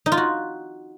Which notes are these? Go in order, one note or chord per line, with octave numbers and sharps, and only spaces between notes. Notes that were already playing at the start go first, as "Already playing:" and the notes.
D#4
F4
F#4